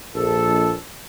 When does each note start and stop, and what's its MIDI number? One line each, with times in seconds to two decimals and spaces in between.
0.16 0.73 34
0.16 0.73 69